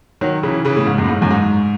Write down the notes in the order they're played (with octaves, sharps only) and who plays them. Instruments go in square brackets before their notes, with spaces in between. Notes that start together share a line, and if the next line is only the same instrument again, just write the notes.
[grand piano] D#3 F#3
C#3 E3
C#3 E3
A2 C#3
G#2
F#2
A2
G#2
F#2
G#2